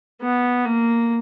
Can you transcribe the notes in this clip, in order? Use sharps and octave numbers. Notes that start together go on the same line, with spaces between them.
B3
A#3